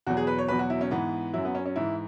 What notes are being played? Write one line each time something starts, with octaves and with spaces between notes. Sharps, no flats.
E2 B2 F#3 F#4
G#4
B4
C#5
E2 B2 F#3 B4
F#4
E4
C#4
G#2 E3 B3
F#2 F#3 E4
B3
C#4
C#4
G#2 E3 E4